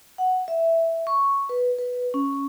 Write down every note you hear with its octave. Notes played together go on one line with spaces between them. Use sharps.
F#5
E5
C#6
B4
B4
C#4